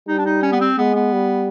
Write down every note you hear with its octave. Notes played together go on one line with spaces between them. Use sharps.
G3 D#4
D4
D#4
C#4
B3
C4
G#3 B3
B3
G3